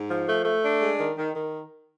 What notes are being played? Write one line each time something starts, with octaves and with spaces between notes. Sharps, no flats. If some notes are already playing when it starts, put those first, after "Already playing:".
Already playing: G#2
F3
A3
A3
D4
G#3
D#3
D#3
D#3